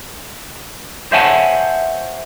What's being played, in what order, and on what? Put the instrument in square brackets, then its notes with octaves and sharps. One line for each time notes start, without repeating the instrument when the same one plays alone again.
[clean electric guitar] C5 C#5 E5 F#5 G#5 A5